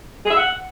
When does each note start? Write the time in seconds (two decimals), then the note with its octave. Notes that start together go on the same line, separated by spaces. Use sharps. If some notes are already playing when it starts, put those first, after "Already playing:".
0.25 G#4
0.31 E5
0.37 F#5